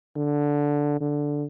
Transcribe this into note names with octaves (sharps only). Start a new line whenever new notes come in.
D3
D3